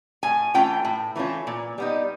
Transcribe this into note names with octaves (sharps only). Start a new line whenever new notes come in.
A2 G#5
E3 A3 C#4 F4 G5
A2
E3 A3 C#4 F4
A#2
G3 B3 D#4